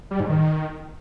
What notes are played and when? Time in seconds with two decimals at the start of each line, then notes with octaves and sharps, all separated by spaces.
0.11 G3
0.20 G#2
0.29 D#3